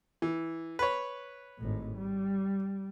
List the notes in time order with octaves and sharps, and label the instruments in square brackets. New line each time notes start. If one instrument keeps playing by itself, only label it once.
[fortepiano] E3
B4 C#5
[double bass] G#1 A2
G3